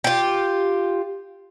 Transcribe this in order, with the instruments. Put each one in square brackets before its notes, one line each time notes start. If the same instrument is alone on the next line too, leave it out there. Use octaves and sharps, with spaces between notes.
[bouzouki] F4 G4